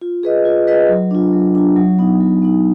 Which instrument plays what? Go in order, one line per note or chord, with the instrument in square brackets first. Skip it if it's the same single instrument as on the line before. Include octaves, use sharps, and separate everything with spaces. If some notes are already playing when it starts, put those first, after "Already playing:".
[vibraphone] F4
G#4 B4 D#5
F4
G#4 B4 D#5
F#3
D4 F4
F#3
D4 F4
F#3
B3 D#4
F#3
B3 D#4